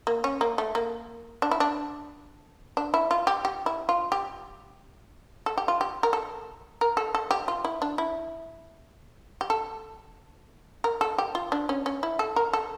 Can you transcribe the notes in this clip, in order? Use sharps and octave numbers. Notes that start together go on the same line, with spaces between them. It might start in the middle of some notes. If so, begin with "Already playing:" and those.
A#3
C#4
A#3
A3
A#3
D4
E4
D4
D4
E4
F4
G4
G4
E4
F4
G4
A4
G4
F4
G4
A#4
A4
A#4
A4
A4
G4
F4
E4
D4
E4
G4
A4
A#4
A4
G4
F4
D4
C#4
C#4
E4
A4
A#4
A4